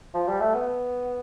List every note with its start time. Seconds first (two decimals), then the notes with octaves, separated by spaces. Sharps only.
0.14 F3
0.28 G3
0.40 A3
0.55 B3